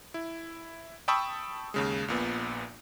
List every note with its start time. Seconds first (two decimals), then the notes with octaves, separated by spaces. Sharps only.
0.14 E4
1.08 G5 A5 B5 C#6 D#6 E6
1.74 D#2 C#3 G#3
2.08 A#1 A#2 B3